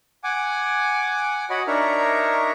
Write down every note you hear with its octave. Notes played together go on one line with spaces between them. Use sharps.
F#5 G#5 D6
F#4 C#5 D#5 F#5 B5
D4 D#4 A#4 C#5 E5 A#5